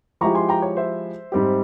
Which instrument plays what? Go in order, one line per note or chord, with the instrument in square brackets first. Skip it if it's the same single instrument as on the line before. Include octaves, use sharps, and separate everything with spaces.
[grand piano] F3 G#3 E4 G4 [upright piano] A#5 C#6
[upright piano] G#5 C6
G5 A#5
C#5
C5 E5
[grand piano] G#2 G3 C4 G4